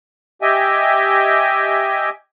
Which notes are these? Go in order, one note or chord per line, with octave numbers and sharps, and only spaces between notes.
G4 D#5 E5 G5 G#5